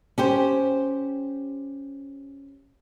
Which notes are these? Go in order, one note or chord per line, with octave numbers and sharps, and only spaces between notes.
C#4 G4 C5